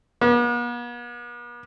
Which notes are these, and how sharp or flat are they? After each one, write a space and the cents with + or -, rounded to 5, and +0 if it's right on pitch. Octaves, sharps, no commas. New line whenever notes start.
B3 -45